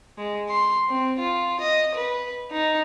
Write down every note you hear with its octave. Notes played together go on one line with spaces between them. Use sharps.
G#3
C6
C4
F4
D#5
B4
D#4